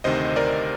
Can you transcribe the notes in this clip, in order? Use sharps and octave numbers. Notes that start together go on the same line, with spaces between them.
D2 C3 D#3 C5 D#5
A#4 D5